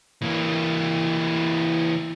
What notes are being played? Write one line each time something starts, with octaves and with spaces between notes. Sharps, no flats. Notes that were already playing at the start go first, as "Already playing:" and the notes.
E3 A#3